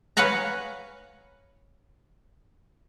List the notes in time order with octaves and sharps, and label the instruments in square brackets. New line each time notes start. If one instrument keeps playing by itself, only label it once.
[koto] B4 C#5 F5 F#5 G#5 A#5